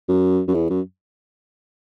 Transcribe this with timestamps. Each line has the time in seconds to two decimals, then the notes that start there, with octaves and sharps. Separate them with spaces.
0.08 F#2
0.48 F#2
0.54 E2
0.70 F#2